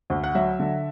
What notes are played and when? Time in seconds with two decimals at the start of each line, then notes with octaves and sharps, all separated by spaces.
0.10 D2
0.24 F#5
0.35 F#3 E5
0.59 D3